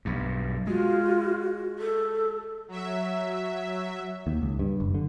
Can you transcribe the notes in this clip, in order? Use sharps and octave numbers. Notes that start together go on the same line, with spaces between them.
B1 G2
G#3 F4 F#4
A4
F#3 E5
D#2
C#2
G2
F#1
D3